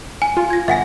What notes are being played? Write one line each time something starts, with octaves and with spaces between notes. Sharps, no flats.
G#5
F4
G#6 A#6
G1 E5 F#5 G#5 A#6